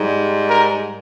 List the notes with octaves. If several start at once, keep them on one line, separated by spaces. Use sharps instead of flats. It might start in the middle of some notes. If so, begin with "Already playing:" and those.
Already playing: G#2 G3
A#4